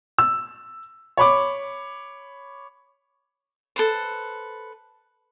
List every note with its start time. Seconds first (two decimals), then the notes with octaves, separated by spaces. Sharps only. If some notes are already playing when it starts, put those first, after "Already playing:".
0.19 E6
1.17 C#5 B5 D6
3.76 A4 B4 C5